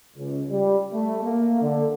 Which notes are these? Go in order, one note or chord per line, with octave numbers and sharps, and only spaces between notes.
C#2
G3
A3
A#3
D3